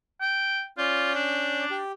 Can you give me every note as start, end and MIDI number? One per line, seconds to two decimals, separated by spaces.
0.21 0.63 79
0.78 1.65 61
0.78 1.11 65
0.78 1.65 74
0.78 1.65 91
1.15 1.77 62
1.71 1.92 67